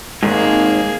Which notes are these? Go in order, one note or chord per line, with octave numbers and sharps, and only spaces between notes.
G#2 D#3 A#3 G#4